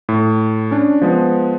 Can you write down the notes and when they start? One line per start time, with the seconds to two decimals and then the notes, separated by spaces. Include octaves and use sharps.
0.09 A2
0.71 C#4 D4
1.02 F3 G#3 B3